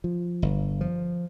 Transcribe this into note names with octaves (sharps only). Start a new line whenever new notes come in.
F3
G1
F3